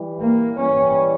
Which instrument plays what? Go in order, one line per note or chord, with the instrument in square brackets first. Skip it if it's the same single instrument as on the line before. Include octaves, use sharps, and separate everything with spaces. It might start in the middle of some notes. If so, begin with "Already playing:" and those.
Already playing: [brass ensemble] E3 G3
[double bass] A#3
[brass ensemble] E3 G3 [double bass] C#4